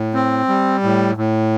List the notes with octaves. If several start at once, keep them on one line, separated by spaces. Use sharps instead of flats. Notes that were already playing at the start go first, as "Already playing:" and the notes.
Already playing: A2
C4
G3
A2
A2